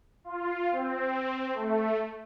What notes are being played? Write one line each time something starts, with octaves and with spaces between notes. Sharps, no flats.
F4
C4
A3